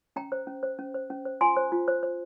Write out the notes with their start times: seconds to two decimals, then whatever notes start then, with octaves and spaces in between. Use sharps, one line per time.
0.16 C#4 G5 A#5
0.32 C5
0.47 C#4
0.63 C5
0.79 C#4
0.94 C5
1.10 C#4
1.25 C5
1.41 F4 G#5 C6
1.57 C5
1.72 F4
1.88 C5
2.03 C5